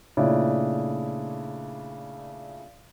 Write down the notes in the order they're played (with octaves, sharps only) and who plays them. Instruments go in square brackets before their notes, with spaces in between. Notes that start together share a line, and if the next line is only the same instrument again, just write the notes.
[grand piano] A#2 C#3 A3 D4 E4